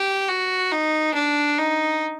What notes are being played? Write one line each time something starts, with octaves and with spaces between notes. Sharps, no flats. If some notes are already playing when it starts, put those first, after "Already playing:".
Already playing: G4
F#4
D#4
D4
D#4